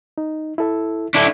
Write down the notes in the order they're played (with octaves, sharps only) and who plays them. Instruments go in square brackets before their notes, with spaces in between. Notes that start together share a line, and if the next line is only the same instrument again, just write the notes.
[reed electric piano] D#4
E4 A4 E5
[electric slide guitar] D4 E4 A4